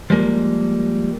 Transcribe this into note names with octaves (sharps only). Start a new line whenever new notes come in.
F3 G3 G#3 A#3